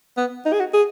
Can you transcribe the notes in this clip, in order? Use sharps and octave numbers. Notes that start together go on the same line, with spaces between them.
B3
D#4
G#4
F#4
G#4